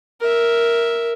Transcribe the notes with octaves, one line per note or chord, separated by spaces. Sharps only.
A#4 E5